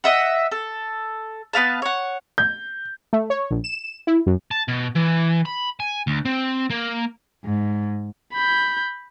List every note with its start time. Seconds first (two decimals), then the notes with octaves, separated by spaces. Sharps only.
0.04 D#5 E5 F#5
0.51 A4
1.53 B3 B4 F5 A5
1.82 C#5 F#5
2.38 G6
3.13 A3
3.30 C#5
3.51 A#1
3.64 E7
4.07 E4
4.26 F#2
4.51 A5
4.68 B2
4.96 E3
5.46 B5
5.80 G#5
6.07 D2
6.25 C4
6.70 A#3
7.45 G#2
8.33 B5 G6